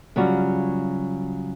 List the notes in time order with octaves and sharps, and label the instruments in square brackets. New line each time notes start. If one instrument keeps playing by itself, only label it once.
[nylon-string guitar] C#3 F#3 G3 F4 F#4